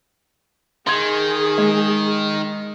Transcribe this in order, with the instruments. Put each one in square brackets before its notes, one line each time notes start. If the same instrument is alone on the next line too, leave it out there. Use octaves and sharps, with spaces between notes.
[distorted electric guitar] D#3 [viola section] G#4 [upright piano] C6 G#6
[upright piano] G#3